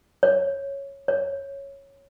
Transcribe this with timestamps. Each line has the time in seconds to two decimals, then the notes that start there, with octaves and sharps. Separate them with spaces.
0.23 C#5
1.08 C#5